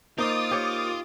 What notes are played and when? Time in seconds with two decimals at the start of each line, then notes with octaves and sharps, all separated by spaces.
0.18 A#3 D#4 F4 C5 D#5 D6 D#6 A6
0.51 G4 C#5